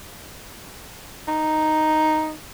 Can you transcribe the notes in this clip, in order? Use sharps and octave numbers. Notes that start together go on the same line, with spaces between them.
D#4